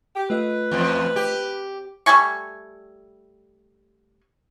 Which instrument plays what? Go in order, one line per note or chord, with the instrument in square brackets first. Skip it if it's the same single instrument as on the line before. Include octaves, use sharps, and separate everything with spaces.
[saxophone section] G4
[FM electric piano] A3 F4 D#5 [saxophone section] B4
[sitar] E2 F3
G4
[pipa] G3 A3 G#5 C#6